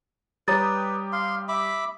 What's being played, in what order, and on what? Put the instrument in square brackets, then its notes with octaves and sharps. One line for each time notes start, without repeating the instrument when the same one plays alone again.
[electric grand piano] G3 G4 D#6 [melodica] B4 [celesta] C#5 A#5 A6
[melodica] F5 C6
E5 B5 D6